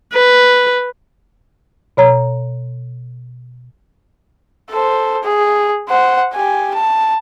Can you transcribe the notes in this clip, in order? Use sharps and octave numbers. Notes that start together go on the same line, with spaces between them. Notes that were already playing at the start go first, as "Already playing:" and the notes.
B4
B2 C#5 A#5
A4 C5
G#4
C5 F#5
G4 G#5
A5